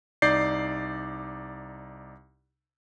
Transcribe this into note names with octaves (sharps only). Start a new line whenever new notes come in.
C2 D#4 D5 G6 C7